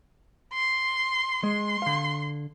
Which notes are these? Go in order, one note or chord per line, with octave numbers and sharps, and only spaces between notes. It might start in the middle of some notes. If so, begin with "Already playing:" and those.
C6
G#3 C6
D3 F5